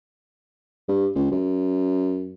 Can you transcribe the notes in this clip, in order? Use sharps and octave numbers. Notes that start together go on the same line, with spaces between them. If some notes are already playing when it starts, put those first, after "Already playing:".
G2
C#2
F#2